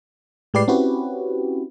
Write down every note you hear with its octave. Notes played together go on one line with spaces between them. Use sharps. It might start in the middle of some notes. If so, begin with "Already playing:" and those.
A2 G#3 G4 B4 D5 C7
C4 C#4 E4 F#4 G4 B4